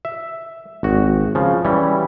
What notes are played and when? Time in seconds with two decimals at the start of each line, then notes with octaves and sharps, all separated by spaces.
0.05 E5
0.83 G#1 F#4
1.35 C#3 F3
1.65 E3 G3 C#4